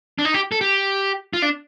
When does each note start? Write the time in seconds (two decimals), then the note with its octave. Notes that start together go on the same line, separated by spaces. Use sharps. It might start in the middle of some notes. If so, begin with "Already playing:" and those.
0.19 D4
0.25 D#4
0.34 G4
0.52 A4
0.61 G4
1.33 F4
1.42 D4